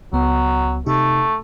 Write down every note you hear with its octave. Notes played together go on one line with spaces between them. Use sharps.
C#2 F#3 B3
C3 A3 D#4 G4